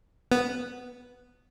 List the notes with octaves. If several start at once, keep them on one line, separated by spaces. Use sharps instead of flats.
B3